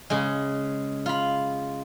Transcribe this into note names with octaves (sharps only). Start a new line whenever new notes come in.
C#3 G#3
F4 B5